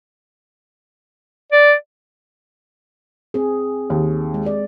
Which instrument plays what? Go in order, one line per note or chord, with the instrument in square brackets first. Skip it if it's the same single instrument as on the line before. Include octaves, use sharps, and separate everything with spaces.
[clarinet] D5
[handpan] C4 G#4
[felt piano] D#2
[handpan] G#3
D5